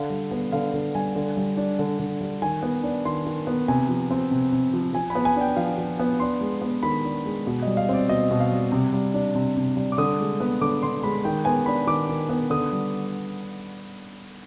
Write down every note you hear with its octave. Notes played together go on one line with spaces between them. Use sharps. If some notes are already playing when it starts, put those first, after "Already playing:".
Already playing: D3 F5
G3
B3
D3 F5
D3
G3 G#5
D3
G3
D4
D3
D3
G3
D#3 G#5
B3
D4
D#3 C6
D#3
B3
C3 G#5
F3
C4
C3
C3
F3
F3 G#5
B5
B3
G#5
D4 G5
F3 F5
F3
B3
D4 C6
G#3
B3
D#3 B5
D4
G#3
B2
G3 D#5
F5
C4 D5
B2 D#5
B2
F5
G3
C3
G3
D4
C3
C3
G3
D6
D3 D#6
G#3
B3
D3 D6
D3 C6
G#3 B5
D#3 G5
B3 G#5
D4 B5
D#3 D6
D#3
B3
D3 D#6
G3